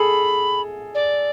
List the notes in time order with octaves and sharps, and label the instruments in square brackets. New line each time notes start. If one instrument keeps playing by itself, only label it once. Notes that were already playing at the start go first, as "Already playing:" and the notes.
Already playing: [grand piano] G#4 A4 [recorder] B5
[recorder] D5